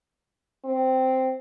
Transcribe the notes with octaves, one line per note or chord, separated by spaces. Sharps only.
C4